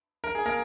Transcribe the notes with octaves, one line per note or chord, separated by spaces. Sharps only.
A#4
G#4
A#3 A#4